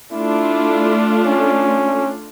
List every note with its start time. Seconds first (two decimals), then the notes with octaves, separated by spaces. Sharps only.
0.12 A3 D4 E4 F4
1.26 C#4